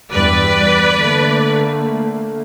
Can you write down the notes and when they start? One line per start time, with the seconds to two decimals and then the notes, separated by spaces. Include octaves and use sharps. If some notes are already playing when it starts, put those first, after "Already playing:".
0.11 E2 G2 G3 B4 D5
0.94 D3 A3 A#3